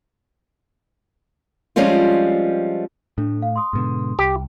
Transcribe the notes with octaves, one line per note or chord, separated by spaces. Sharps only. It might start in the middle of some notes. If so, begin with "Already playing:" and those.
F3 G3 G#3 C4 C#4 F4
A2 A3 D4
F5
C6 D#6
G#2 B2 D3
C2 G4